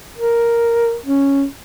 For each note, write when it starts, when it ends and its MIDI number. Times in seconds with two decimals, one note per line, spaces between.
0.18 0.96 70
1.06 1.45 61